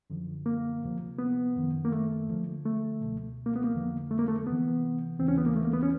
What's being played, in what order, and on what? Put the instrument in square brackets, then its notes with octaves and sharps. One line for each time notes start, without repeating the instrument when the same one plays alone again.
[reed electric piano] F#2 D3 F3
A#3
D2 C3 F3
B3
F#2 D#3
A#3
A3
D2 D3 F3
A3
C#2 B2
A#3
B3
A#3
F2 D3 F3
A3
A#3
A3
D2 C3 E3 B3
D#2 C#3 E3 C4
C#4
B3
A#3
A3
A#3
B3
C#4